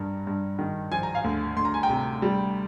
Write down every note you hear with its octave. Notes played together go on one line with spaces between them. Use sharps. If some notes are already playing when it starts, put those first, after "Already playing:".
Already playing: G2 G3 A#4
G2
D#3
F3 G#5
A#5
F5 G#5
D2
D2 C6
A#5
G#5
G5 A#5
C3
G3